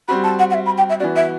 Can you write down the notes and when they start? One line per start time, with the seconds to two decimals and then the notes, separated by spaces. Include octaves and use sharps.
0.08 G3 C4 F#4 B5
0.24 A5
0.39 F#5
0.50 F#5
0.54 E5
0.66 B5
0.78 G5
0.89 E5
1.00 E3 B3 F#4 D5
1.16 E5